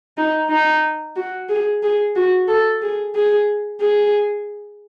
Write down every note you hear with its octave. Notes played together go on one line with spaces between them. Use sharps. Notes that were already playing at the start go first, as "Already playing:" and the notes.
D#4
D#4
F#4
G#4
G#4
F#4
A4
G#4
G#4
G#4